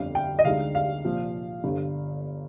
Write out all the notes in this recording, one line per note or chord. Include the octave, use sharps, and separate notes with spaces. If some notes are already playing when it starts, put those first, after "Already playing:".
Already playing: G1 F2 D3 G3 F5
G5
D#5
D2 D3 G#3 D#4 F5
F5
C2 A#2 F3
G1 G2 D3